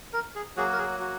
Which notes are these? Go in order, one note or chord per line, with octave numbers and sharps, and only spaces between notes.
A#4
G#4
F#3 A#3 F#4 G#4
A#4
G#4
F#4